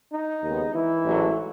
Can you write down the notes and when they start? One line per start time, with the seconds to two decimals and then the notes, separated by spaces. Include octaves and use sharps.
0.13 D#4
0.43 D#2 C#3 G#3 B3
0.74 E3 E4
1.05 A1 G#2 F#3 A3